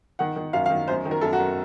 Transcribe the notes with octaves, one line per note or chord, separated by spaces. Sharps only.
D#3 F#5
D#3
F#2 F5
F5
D#3
F#2 C5
D#3
A#4
F#2 A4
F#4
F#2